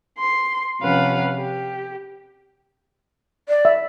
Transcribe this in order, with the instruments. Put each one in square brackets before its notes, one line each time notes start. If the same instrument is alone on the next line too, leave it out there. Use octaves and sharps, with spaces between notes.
[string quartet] C6
C3 F3 C#4 B4 F5 F#5
G4
[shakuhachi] D5
[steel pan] E5